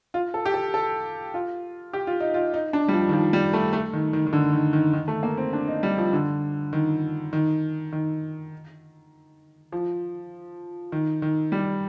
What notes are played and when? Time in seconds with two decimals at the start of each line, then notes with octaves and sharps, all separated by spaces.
0.14 F4
0.34 A4
0.46 G4
0.54 A4
0.74 A4
1.34 F4
1.93 G4
2.07 F4
2.20 D#4
2.34 F4
2.54 D#4
2.73 D4
2.88 G3
2.93 F3
3.09 D#3
3.13 F3
3.33 G3
3.53 A3
3.73 A3
3.93 D#3
4.13 D#3
4.27 D#3
4.33 D3
4.53 D#3
4.73 D#3
4.93 D#3
5.08 A3
5.23 A#3
5.37 C4
5.53 D4
5.68 D#4
5.83 G3
5.98 F3
6.13 D3
6.73 D#3
7.33 D#3
7.93 D#3
9.72 F3
10.92 D#3
11.22 D#3
11.52 G3